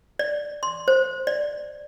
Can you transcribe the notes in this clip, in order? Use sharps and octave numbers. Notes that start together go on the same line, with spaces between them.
D5
C6
C5
D5